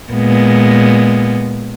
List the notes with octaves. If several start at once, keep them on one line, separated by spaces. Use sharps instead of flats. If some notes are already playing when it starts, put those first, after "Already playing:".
A#2 G#3 B3